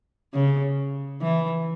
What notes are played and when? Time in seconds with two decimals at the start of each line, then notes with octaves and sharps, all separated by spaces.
0.34 C#3
1.22 E3